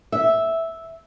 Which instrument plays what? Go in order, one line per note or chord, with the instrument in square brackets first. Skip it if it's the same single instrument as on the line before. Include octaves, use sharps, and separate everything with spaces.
[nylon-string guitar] E5